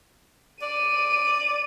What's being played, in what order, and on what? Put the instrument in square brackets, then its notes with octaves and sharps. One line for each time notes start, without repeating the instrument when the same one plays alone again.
[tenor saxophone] D5 [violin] D#7